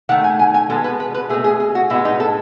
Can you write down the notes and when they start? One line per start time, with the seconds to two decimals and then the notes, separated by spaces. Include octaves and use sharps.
0.09 D#3 A3 F#5
0.24 G#5
0.39 G#5
0.54 G#5
0.70 B2 G#3 B3 A4
0.84 B4
1.00 B4
1.14 B4
1.29 A3 G#4
1.33 B2
1.44 G#4
1.60 G#4
1.75 F#4
1.90 A2 G#3 B3 E4
2.05 D#4
2.20 A4